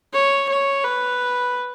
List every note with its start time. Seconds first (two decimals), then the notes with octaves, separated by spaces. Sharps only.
0.13 C#5
0.49 C#5
0.84 B4